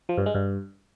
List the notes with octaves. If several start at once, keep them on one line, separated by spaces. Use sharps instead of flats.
F3
G2
G#3
G2